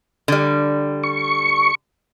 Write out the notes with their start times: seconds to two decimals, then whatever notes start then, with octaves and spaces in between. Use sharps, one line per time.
0.28 D3 G3
1.03 C#6